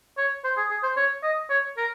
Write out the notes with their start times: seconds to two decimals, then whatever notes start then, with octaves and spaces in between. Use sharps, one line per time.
0.18 C#5
0.44 C5
0.57 G#4
0.70 G#4
0.83 C5
0.97 C#5
1.23 D#5
1.50 C#5
1.77 A#4